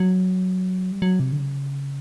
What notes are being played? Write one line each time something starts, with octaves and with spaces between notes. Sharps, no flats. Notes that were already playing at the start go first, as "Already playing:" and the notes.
Already playing: F#3
G3
F#3
C3
D3
C#3